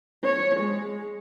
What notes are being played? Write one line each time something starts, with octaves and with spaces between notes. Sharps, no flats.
C#5
G#3